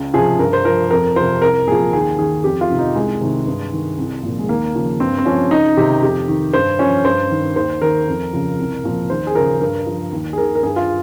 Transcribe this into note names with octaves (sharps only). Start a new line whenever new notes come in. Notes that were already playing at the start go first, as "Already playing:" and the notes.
Already playing: C#2
C3 F3 G#4
G2 A#4
C5
F3 A#4
F2 A#4
C3 F3 C5
C2 A#4
A#2 F3 G#4
D#2 G#4
D#3 G#4
F2 G4
F4
C3 D#3
D#4
C2 G#3
C3 D#3
G2
D#3
C2
A#2 F3
G#3
D#2 A#3
C#3 F3
G2 C4
C4
F3 C#4
C#2 D#4
C3 D#3 G4
F2 G4
D#3
G2 C5
F3 C#4
G2 C5
D#3
D#2 C5
D#3 A#4
F2
C#3 F3
C2
A#2 F3
D#2 C5
G#4
C#3 F3 A#4
G2 A#4
F3
D#2
G#4
D#3 A#4
A#4
G2 G#4
F4